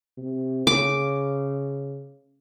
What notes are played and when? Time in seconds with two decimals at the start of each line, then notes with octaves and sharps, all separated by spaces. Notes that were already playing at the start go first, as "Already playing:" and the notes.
0.17 C3
0.67 C#3 D6